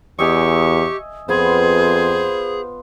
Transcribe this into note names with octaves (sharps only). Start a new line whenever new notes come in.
E2 G4 D#5 E5 G#5 C#6
F2 B3 F4 G#4 C5